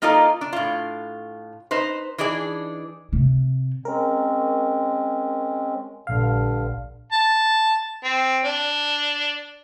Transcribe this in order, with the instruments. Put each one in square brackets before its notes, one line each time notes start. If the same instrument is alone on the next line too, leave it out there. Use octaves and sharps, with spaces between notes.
[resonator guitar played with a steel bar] A#3 D#4 F4 A4 D5 D#5
D4
A2 F4
D#4 B4 C5
E3 D4 D#4 G#4 D5
[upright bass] C3
[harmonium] G#3 C4 C#4 [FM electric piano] A#4
[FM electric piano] A#1 F5 [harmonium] G2 D3
[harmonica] A5
C4
D4